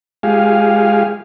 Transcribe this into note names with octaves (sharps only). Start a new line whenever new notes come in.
G#3 F4 G4 G#4 F5